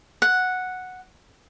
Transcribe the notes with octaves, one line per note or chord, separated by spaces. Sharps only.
F#5